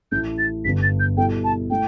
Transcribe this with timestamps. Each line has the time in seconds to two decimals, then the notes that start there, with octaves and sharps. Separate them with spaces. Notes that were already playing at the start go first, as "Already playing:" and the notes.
0.12 A1 A2 E3 A3 E4 G6
0.38 A6
0.64 G1 G2 D3 B3 B6
0.83 A6
1.00 G6
1.17 B2 G3 E4 A4 G5
1.44 A5
1.70 A3 E4 A4 G5